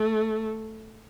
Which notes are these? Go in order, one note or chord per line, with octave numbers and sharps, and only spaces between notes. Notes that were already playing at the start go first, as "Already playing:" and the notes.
Already playing: A3